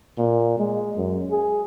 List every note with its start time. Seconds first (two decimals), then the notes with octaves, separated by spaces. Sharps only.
0.18 A#2
0.59 G#3
0.97 F#2
1.31 G#4